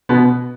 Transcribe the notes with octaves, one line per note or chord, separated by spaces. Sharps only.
B2 B3